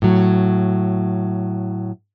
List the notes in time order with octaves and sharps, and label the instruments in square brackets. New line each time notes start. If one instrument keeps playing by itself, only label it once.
[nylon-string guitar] A2 F#3